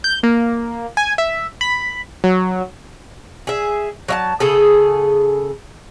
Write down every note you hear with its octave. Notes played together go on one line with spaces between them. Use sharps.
G6
A#3
G#5
E5
B5
F#3
G#4 E5
F#3 E5 A5
C#3 G#4 A4